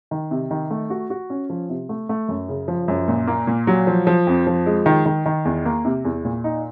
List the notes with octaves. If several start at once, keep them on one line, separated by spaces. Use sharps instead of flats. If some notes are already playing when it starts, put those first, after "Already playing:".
D#3
C3
D#3
A3
F#4
F#4
C#4
F3
C3
A3
A3
F#2
C#3
F3
F#2
A#2
A#3
A#2
F#3
F3
F3
F2
F3
G#3
D#3
D#3
D#3
E2
A#3
C3
E2
A#2
D#4